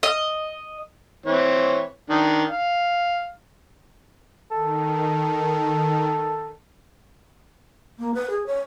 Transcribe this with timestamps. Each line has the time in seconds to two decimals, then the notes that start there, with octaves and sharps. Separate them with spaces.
0.03 D#5
1.26 E3 C4 C#5
2.10 D#3 D4
2.49 F5
4.51 D#3 A4
7.99 A#3
8.14 B4
8.30 G#4
8.46 C#5